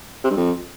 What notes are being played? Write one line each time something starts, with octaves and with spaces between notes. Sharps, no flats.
C3
G2
F2